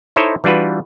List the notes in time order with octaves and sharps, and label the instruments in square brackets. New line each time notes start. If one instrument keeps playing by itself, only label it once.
[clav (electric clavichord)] D#4 E4 A4 C5 C#5 D#5
E3 G3 D4 F4 F#4 B4